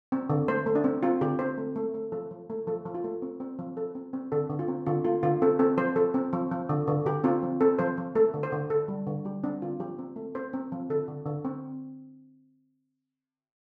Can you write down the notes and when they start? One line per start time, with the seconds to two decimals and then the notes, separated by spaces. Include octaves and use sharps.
0.12 C4
0.30 D3
0.48 A3 C5
0.66 A3
0.75 D4
0.84 C4
1.03 C4 F4
1.21 D3 G4
1.39 C4 C5
1.58 A3
1.76 A3
1.94 A3
2.12 F3 A4
2.31 F3
2.50 A3
2.67 F3 A4
2.86 F3
2.95 F4
3.04 A3
3.22 C4
3.40 C4
3.59 F3
3.77 F3 A4
3.95 C4
4.13 C4
4.32 D3 A4
4.50 D3
4.59 F4
4.68 C4
4.86 D3 F4
5.05 A3 F4
5.23 D3 F4
5.42 C4 A4
5.59 C4 A4
5.77 F3 C5
5.96 F3 A4
6.14 C4
6.33 F3
6.51 F3
6.69 D3
6.87 D3
7.06 D3 G4
7.24 C4 F4
7.43 F3
7.61 C4 A4
7.79 F3 C5
7.97 F3
8.15 A3 A4
8.34 D3
8.43 C5
8.52 D3
8.70 D3 A4
8.88 G3
9.07 D3
9.25 G3 G4
9.44 C4 D4
9.62 D3 F4
9.80 F3 G4
9.99 C4
10.16 A3
10.35 C4 C5
10.53 C4
10.72 F3
10.90 D3 A4
11.08 D3
11.26 D3
11.45 C4